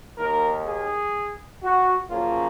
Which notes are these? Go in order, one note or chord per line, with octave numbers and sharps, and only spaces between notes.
D#2 D#3 A#3 A#4
G#4
F#4
F#2 C#3 F3 A#3 F4